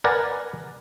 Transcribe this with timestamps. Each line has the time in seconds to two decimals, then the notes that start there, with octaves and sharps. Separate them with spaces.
0.04 A#4 B4 D5 F#5 G#5 A#5